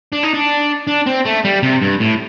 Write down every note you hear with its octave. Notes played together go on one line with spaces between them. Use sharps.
D4
D#4
D4
D4
C4
A3
G3
C3
G2
A2